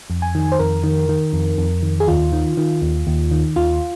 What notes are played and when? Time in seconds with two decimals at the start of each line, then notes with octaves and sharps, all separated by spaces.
0.10 F2
0.22 G#5
0.35 D#3
0.52 C5
0.59 F2 A#4
0.84 D#3
1.09 D#3
1.33 F2
1.58 F2
1.83 D#3
2.00 G#4
2.08 D#2 F4
2.32 D#3
2.57 D#3
2.82 D#2
3.07 D#2
3.31 D#3
3.56 D#2 F4